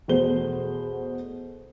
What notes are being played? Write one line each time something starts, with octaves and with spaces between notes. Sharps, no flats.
E2 B2 A3 C5 G7